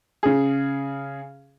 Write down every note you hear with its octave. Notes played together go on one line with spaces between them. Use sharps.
C#3 G#4